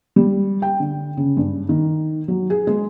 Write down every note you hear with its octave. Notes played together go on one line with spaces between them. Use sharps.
G3
G5
D3
C#3
G2
D#3
F#3
G#4
G#3